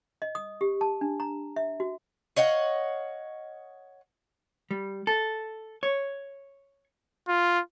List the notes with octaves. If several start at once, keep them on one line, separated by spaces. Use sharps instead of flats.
D#5
D#6
G4
A5
D4
A#5
E5
F#4
C#5 D#5 F5 F#5
G3
A4
C#5
F4